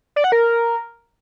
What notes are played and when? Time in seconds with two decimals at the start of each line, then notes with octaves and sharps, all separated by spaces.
0.16 D5
0.24 F#5
0.32 A#4